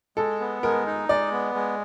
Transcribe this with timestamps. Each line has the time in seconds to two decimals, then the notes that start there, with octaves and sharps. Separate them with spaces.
0.17 G#3 A4
0.40 B3
0.63 G#3 A#4
0.86 D#4
1.09 G#3 D5
1.32 B3
1.55 G#3